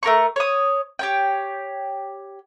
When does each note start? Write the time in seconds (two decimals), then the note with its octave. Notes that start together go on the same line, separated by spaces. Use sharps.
0.03 A3 A#4 A#5 C#6
0.36 C#5 D#6
0.99 G4 C#5 G5